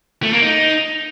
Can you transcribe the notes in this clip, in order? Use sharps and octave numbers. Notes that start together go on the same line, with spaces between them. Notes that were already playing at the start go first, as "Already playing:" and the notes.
A3
A#3
D#4